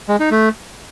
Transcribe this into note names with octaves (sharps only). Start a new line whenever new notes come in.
G#3
D#4
A3